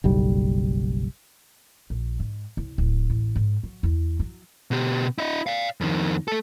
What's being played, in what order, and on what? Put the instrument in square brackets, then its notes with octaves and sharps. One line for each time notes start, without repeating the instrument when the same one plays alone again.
[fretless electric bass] F#1 B1 G3
[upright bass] A#1
G#2
C2
D1
A1
G#2
F#3
E2
F#3
[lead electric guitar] B2 G4
E4 D#5
D5 F5
F2 D#3
A3 A4